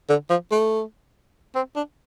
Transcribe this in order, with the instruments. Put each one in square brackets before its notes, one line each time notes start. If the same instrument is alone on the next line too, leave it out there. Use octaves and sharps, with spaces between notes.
[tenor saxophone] D3
F3
A3
C4
D4